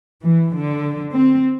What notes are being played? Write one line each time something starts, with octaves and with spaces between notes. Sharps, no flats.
E3
D3
C4